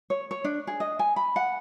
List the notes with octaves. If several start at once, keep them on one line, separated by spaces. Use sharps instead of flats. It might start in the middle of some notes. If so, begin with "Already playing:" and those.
C#5
C#5
D4
G#4
D#5
G#5
B5
F#5